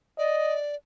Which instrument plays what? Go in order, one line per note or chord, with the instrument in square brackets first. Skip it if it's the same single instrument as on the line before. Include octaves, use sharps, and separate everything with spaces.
[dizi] D5 [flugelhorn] D#5